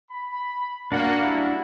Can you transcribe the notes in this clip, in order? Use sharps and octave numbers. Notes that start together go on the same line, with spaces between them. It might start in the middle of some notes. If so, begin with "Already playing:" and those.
B5
A#3 D4 F#4 F#5
F#2 G3 E4